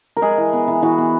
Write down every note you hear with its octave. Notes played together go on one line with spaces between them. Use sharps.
A#4
G#3 G#4
E3
B3
E3
E3 F#4
B3